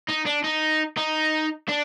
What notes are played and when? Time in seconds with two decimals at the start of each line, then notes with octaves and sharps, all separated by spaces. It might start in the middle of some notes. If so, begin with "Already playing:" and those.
0.09 D#4
0.26 D4
0.44 D#4
0.97 D#4
1.69 D4